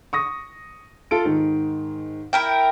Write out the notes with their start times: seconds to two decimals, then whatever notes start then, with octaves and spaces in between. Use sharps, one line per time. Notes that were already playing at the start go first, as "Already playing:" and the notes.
0.13 C#6 D#6 A#6
1.11 F4 A4 D7
1.25 G#2 D#3
2.33 E4 A#4 G5